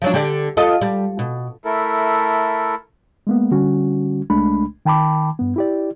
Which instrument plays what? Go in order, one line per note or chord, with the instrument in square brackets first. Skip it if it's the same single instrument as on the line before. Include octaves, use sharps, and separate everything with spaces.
[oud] F3 F#3 D4
D3 G4 D5
F4 A4 D#5
G3
B2
[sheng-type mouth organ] A3 E4 A4 A#4
[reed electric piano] G#3 A#3 B3
D3 G3 C#4 F#4
C2 G#3 A3 D4 B5
D#3 G5 A5 B5 D6
G2 B3
E4 G4 D5